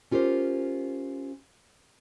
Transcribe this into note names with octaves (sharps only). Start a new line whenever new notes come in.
C#4 F4 G4 A#4 C5